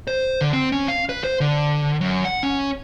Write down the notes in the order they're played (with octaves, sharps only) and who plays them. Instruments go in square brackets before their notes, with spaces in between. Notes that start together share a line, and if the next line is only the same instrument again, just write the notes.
[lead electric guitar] C5
D3
C4
C#4
F5
B4
C5
D3
F#2
F#5
C#4